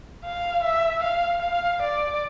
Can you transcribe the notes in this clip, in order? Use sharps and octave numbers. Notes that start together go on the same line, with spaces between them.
F5
E5
F5
F5
D5